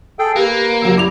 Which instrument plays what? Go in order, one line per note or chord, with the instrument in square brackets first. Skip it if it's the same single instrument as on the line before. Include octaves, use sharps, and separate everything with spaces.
[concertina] G#4 A4 G5
[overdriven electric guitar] A#3 [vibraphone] G4 [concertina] B4
[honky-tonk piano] F#2 C#3 F#3 [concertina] E6
[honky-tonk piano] G3 D6 F7 [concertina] E4